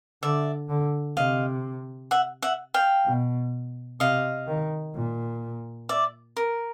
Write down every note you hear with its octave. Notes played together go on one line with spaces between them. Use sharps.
D3 D5 E5
D3
C3 D#5 F5
E5 F#5
E5 F#5
F5 G5
B2
C3 D#5 F5
D#3
A#2
D5 E5
A#4